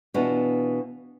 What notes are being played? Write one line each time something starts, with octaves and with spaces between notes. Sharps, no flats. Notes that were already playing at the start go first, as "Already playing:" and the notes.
B2 E3 B3 D4 F4 F#4